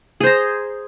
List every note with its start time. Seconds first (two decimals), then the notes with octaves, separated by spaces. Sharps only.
0.20 G#4
0.23 C5
0.27 A#5